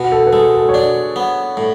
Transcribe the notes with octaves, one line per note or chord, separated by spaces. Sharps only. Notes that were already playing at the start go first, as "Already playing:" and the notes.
Already playing: B2 F#4
A4
B4
G#3 A4
A4
C#5
D4 D5
B3
A2